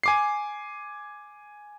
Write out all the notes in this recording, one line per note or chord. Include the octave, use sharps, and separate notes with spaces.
G#5 D6 C7